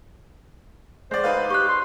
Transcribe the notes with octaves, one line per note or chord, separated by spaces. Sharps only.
G#3 C5 D5
D#4 B4 F5
G4 C#6 F#6
C6